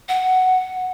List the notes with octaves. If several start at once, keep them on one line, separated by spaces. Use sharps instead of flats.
F#5